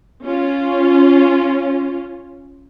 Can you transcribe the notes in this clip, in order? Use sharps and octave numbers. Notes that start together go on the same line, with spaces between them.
C#4 F4